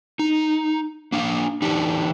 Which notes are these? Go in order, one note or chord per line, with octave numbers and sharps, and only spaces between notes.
D#4
A#3 D4 F5
E3 D4 D#4 G4